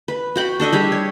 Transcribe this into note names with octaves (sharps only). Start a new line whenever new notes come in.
B4
F#4 G5 B5
D4 A4 D#5 E5
G3 G4 G#4 E5
C#5